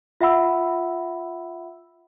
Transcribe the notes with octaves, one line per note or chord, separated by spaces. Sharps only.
F4 E5 F#5 B5 E6